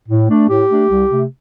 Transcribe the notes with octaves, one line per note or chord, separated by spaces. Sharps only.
A2
A3 D4
A2 G4
A3 D4
C2
C3 A3